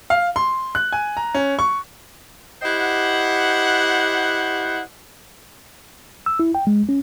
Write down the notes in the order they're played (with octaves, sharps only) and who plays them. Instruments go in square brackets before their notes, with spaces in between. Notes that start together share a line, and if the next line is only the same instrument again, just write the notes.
[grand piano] F5
C6
F#6
G#5
A#5
C#4
C#6
[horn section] E4 G4 C5 D#5 F#5
[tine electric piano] E6
E4
G5
G#3
C#4